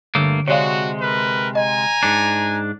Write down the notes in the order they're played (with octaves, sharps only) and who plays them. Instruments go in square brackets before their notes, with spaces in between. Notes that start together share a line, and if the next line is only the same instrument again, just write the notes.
[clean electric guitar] G2 A3 A#3 [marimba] D3
[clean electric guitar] C3 G#3 [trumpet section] F#4 [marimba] C#5 D5 F5
[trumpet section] A#4 B4
[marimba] D#5 [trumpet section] G#5 A#5
[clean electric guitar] G#2 D4